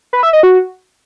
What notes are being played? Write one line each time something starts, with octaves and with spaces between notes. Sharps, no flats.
B4
E5
D#5
F#4